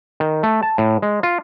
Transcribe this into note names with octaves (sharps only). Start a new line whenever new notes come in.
D#3
A3
A5
A2
G#3
F4